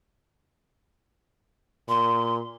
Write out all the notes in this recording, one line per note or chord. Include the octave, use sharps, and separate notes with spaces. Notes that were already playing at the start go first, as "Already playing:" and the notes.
A#2 C6